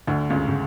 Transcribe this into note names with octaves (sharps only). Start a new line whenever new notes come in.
D2 D3
C#2 C#3
C#3